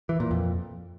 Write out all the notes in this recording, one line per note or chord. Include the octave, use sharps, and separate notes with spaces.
E3
A#2
F2